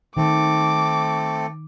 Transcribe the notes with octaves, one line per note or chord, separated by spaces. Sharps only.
D#3 A3 C4 D6